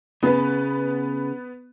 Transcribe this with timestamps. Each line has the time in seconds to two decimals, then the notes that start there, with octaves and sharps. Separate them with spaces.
0.23 C#3 B3 B4